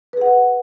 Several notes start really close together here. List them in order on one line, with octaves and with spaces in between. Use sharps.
B4 G#4 F#5